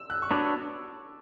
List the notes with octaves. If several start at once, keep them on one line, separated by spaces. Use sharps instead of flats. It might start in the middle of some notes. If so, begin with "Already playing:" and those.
Already playing: E6
F#6
C#6
B3 D4 F#4 C#5 D6